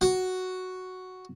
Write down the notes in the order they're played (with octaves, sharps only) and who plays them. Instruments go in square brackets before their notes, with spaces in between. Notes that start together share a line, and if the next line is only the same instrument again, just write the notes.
[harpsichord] F#4